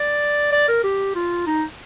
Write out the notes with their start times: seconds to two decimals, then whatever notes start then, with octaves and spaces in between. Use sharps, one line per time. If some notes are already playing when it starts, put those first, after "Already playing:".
Already playing: D5
0.52 D5
0.68 A#4
0.84 G4
1.15 F4
1.47 D#4